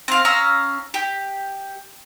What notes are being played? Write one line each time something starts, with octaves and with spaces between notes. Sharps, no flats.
C4 F5
C#4 F5 A#5 E6
G4